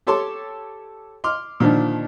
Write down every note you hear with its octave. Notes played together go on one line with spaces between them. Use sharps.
G4 A4 C#5 A5 C6 D6
C6 D6 F6
A#2 D3 D#3 F3 D4